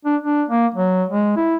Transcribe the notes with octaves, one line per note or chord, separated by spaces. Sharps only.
D4
D4
A#3
F#3
G#3
E4